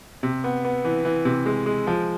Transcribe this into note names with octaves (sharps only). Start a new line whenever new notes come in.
C3
B3
B3
E3
E3
C3
G#3
G#3
F3